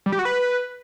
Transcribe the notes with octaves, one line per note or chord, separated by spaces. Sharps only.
G3
G4
F#4
B4